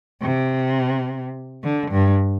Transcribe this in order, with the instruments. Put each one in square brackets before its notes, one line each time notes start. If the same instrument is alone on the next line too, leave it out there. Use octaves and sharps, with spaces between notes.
[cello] C3
D3
G2